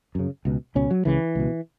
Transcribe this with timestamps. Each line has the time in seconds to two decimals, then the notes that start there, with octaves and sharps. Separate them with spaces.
0.15 F#2 C#3
0.45 C#2 B2
0.75 C#2 B2 C#4
0.91 F#3
1.05 C#2 C#3 E3
1.35 C#2 B2